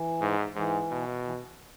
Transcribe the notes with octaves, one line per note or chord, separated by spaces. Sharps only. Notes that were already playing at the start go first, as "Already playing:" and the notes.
Already playing: E3
G#2
G#2 E3
B2
E3